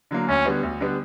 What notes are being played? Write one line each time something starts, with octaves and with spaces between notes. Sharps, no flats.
D3 F#3 A#3
D2 C#4
D3 G3 B3
D2
D3 G3 B3